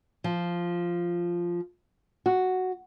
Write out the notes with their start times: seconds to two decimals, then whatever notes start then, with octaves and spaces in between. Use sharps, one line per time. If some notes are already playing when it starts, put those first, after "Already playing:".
0.24 F3
2.26 F#4